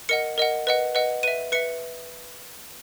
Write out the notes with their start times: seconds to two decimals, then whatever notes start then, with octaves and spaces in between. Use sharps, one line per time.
0.09 A#4 D#5 F#5 C#7
0.38 A#4 D#5 F#5
0.67 B4 D#5 F#5
0.95 B4 D#5 F#5
1.23 B4 E5 D#7
1.52 B4 E5 C#7